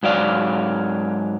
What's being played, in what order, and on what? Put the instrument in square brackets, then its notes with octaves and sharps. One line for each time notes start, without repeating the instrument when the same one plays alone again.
[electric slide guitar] G#2 F#3 D5 F5